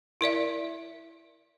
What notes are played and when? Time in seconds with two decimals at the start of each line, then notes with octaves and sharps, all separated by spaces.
0.21 E4 A#4 D5 E5